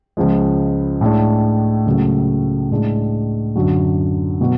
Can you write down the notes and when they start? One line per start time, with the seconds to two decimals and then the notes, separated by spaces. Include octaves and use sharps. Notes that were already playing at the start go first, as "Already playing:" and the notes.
0.17 C#2 C#3 F3 G#3
1.01 A2 G#3 D4
1.86 C#2 C#3 F#3 A3
2.71 A2 G#3 D4
3.56 F#2 D3 F#3
4.41 B2 F#3